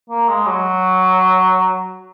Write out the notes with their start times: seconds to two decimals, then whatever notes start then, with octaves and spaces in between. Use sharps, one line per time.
0.10 A#3
0.29 G#3
0.46 F#3